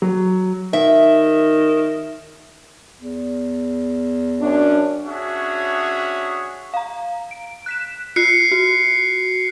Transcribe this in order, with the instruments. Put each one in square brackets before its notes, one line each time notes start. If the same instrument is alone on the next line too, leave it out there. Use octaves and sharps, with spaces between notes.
[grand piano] F#3
[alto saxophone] D#3 [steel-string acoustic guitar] E5
[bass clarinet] E2
[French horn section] F#2 C#4 D4
[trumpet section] C#4 D4 F#4 G#4 C#5 E5
[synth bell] F5 A#5
D7
F#6 B6 E7
[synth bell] F4 [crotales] F#6 C7 C#7
[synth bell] F#4